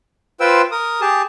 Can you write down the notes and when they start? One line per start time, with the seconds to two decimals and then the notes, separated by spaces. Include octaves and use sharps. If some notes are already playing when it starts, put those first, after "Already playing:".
0.40 F4 B4 C5 G5 E6
0.71 A#4 D#6
1.01 G4 G#4 A5